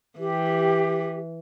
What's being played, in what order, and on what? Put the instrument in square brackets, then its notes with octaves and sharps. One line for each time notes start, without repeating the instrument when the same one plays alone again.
[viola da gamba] E3 [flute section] G4